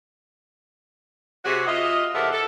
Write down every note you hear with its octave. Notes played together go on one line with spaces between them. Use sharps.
C3 F#4 G#4
F4 D#5 E5
E2 C3 A4 A#4 E5 F#5
A4